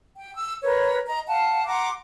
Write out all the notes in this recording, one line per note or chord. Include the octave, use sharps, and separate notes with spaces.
G5
E6
A#4 B4 C#5
D#5 A#5
F5 F#5 A5
F#5 A#5 C6 D6